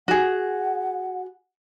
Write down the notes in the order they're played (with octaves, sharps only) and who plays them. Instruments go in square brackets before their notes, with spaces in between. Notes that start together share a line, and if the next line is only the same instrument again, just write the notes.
[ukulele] F#4 G#4 [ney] F#5